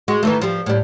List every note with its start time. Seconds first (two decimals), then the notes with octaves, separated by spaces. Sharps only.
0.08 G#3 F#4
0.23 D#3 E3 A3
0.42 F3 G3
0.66 A2 G3